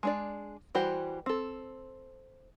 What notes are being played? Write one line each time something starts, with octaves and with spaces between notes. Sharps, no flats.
G#3 D4 D5
E3 G3 F#4 G4 C5
C4 A4